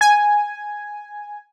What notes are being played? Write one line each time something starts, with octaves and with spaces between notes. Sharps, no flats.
G#5